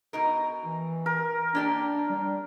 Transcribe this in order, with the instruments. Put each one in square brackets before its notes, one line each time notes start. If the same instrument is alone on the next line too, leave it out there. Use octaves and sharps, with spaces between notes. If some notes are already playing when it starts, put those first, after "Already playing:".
[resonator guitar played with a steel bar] B2 D#4 A#4
[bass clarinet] E3
[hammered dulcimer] A#4
[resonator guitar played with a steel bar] A#3 G4 D5 [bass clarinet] D4
[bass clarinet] G3